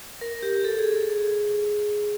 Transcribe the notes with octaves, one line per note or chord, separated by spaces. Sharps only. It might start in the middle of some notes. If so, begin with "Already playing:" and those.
A#4
G4
A4
G#4